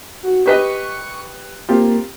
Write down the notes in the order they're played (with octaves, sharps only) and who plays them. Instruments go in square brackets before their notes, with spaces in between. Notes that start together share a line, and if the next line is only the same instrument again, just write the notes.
[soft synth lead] F#4
[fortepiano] G4 B4 D#5 [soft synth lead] C#6
[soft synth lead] A#3 [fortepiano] C4 F4 G4